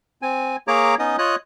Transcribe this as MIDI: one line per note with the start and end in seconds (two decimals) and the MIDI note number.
0.22 0.56 60
0.22 0.56 80
0.68 0.95 58
0.68 0.95 68
0.68 0.95 73
0.68 0.95 82
0.68 0.95 86
0.99 1.16 59
0.99 1.16 61
0.99 1.16 63
0.99 1.16 75
0.99 1.16 87
1.18 1.36 65
1.18 1.36 73
1.18 1.36 75
1.18 1.36 87
1.18 1.36 90